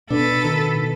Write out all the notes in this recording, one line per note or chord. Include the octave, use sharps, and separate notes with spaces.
B2 D4 A4 B4
D#3